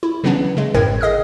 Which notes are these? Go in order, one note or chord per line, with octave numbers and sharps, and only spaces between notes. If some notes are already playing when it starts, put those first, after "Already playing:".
E4
C#3 E3 F#3 B3 C#4 D4
C#3 G#3
G#1 F#2 A2 A#4 G5 G#6
G#4 D#5 D#6 F6